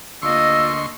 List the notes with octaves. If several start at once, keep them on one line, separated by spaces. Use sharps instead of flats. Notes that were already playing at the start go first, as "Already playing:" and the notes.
D2 A#3 F4 D#5 C6 C#6 E6